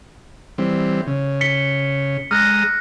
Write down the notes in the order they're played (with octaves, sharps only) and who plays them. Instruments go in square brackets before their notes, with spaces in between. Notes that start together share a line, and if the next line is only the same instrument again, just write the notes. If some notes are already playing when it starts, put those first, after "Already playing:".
[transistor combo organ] E3 G3 C4
C#3
[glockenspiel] B6 C#7 G7
[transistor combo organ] G#3 A#5 D#6 [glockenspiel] F6 F#6 A#6